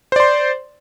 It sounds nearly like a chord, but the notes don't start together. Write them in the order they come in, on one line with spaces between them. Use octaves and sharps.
C5 D5 C6